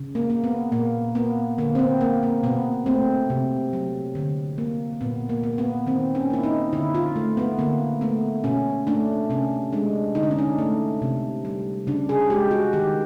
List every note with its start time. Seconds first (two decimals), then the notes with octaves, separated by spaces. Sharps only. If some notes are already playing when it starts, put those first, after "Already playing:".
Already playing: C#3
0.15 A#3
0.30 A#3
0.44 B3
0.72 A#2 A#3
1.15 A#3 B3
1.58 D3 A#3
1.75 C4
1.79 B3
2.01 A#3
2.23 A#3
2.43 B2 B3
2.86 A3 C4
3.30 C3
3.73 F#3
4.15 D3
4.58 A#3
5.01 A#2 B3
5.29 A#3
5.43 A#3
5.58 B3
5.87 D#3 C4
6.15 C#4
6.30 A#3 E4
6.43 D#4
6.73 D3 E4
6.94 F4
7.16 A3
7.37 B3
7.59 D3 A#3
8.01 A3 B3
8.44 B2 C#4
8.87 A3 D4
9.30 C3 C#4
9.73 G#3 D4
10.15 D3 D#4
10.23 D4
10.31 C#4
10.38 D4
10.58 A3
11.02 C3
11.45 G3
11.87 C#3 D4
12.09 G#4
12.30 G#3 G4
12.51 F#4
12.73 D#3 G4